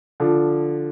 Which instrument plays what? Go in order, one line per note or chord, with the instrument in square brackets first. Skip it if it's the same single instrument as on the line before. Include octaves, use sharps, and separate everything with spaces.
[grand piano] D3 F3